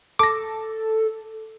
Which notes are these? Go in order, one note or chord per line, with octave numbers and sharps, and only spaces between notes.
A4 D6 A#6